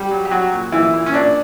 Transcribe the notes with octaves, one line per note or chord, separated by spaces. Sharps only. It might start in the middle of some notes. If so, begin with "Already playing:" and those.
Already playing: G3
F#3
G4
F#3 F#4
A#2
A#2 E3 E4
A#2
C#4
A#2 D4